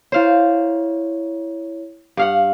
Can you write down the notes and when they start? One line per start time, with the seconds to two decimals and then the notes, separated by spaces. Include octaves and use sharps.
0.12 E4 C5 C#5 F5
2.17 G2 F5 F#5